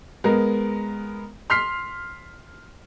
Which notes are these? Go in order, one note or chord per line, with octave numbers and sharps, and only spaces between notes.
G#3 B3 A#4
C6 F6 B6 C7